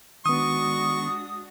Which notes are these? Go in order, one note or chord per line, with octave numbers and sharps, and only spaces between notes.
D#3 G#3 B3 D4 F#4 C#6 D#6